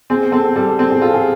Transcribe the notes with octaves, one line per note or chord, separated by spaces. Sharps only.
C4 G#4
C4 A4
G3 A4
C4 A4
G#4
F4 A4
G#4